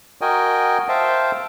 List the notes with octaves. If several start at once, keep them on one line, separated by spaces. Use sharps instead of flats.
F#4 A#4 D#5 G5 G#5
C5 E5 F5 G5 A5